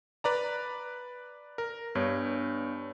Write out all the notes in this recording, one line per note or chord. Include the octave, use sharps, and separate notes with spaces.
B4 D5 A#5
A#4
G2 B3 D4 C#5